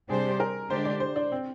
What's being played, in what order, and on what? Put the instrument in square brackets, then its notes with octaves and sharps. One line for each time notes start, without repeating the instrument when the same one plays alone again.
[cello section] C3 G3 D4 G4 C5 [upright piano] G#4
[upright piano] A#4
[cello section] D3 G#3 D4 G4 [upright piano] C5
[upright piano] D5
C5
D4
C4